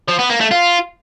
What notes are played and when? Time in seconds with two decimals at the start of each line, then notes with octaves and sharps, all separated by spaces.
0.08 F3
0.19 B3
0.30 A#3
0.40 A3
0.51 F4